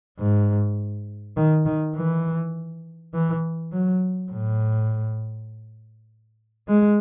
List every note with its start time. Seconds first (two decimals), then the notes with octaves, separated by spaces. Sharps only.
0.18 G#2
1.37 D#3
1.66 D#3
1.96 E3
3.14 E3
3.72 F#3
4.31 A2
6.68 G#3